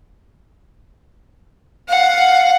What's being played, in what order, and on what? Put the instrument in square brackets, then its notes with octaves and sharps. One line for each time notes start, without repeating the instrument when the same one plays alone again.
[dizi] F5 [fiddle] F#5